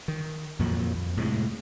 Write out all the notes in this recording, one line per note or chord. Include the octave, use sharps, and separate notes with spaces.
D#3
F2 A#2 D#3 F#3
F2
A2 C3 F3 G#3